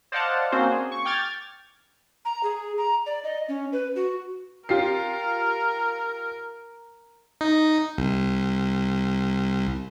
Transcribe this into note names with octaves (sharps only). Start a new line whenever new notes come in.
C5 D5 D#5 F5 F#5 A5
A#3 C4 C#4 F#4 C5
G#4
C#6
G5 D6 F6 G#6 A6
A#5
G#4
A#5
D5
D#5
C#4
B4
F#4
F4 G4 A#4 C7
D#4
C2